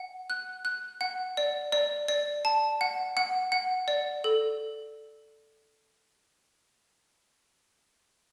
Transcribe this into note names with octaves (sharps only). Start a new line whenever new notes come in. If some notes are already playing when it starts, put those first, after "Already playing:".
Already playing: F#5
F#6
F#6
F#5
D5
D5
D5
A5
F#5
F#5
F#5
D5
A4